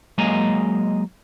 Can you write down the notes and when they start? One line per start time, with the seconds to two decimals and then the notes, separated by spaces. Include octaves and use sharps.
0.18 F#3 G#3 A#3 D#5 G#5 A#5